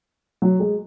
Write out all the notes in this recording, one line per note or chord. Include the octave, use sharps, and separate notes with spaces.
F#3
G#3